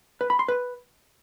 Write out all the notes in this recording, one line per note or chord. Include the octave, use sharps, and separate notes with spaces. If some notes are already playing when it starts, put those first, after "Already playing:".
B4
B5
C6
B4